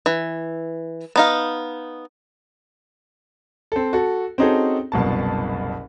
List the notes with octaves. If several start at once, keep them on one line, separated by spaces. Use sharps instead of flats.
E3
B3 D#4 F5
C4 A4
F#4 A4
C4 C#4 D#4 F#4 G#4 A4
F#1 C2 B2 A5